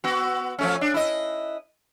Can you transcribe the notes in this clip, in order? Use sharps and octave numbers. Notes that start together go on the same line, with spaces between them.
B3 F#4
F3 A3 C#4
D4
E4 D#5